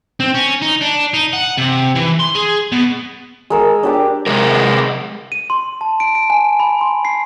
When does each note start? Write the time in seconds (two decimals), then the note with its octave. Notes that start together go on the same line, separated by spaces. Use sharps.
0.20 C4
0.35 C#4
0.62 D#4
0.81 D4
1.14 D#4
1.33 F#5
1.57 C3
1.95 E3
2.19 C6
2.35 G#4
2.72 B2
3.50 G#3 A#4 E6
3.83 D4 G4 D5
4.27 C3 G#3 A#4
5.32 D#7
5.50 C6
5.81 A5
6.00 D7
6.15 D7
6.30 G#5
6.60 B5
6.81 C6
7.05 C7